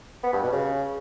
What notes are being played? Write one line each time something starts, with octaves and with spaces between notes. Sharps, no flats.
B3
G2
B2
C#3